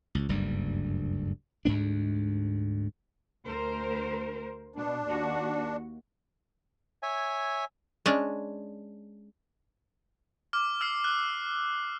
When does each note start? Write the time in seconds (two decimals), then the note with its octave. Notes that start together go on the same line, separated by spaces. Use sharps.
0.15 C#2
0.29 F#1 D2 G2 G3
1.65 D2 G#2 B3 D4
3.45 D2 A#4 C5
4.76 B2 D4
5.05 D#2 F#4
7.03 C#5 E5 G#5
8.06 G#3 C#4 D4
10.53 D6 F6
10.81 E6 F6 C7
11.04 F#6